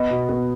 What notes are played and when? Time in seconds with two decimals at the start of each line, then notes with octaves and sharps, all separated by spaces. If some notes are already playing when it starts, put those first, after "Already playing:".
Already playing: B3 D#5
0.11 B2
0.29 B3